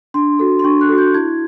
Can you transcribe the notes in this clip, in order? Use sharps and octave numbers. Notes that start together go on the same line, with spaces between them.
D4 C6
F#4 A4
C6
D4 C#6
F#6
F#4 A4
G6
E4 G#6